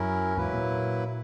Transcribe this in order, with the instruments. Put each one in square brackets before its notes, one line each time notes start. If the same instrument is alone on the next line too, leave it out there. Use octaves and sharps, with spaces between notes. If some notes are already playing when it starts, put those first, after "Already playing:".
Already playing: [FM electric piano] F#2 [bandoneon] F#3 C#4 E4 A#4
[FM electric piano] E2 G#2 [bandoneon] F#3 A#3 E4 B4
[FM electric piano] A#2